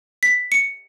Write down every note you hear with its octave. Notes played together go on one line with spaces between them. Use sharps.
B6
C#7